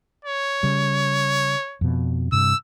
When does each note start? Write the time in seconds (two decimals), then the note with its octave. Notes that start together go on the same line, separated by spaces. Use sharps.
0.25 C#5
0.63 C#3 G3
1.81 F2 B2
2.32 G2 C3 E6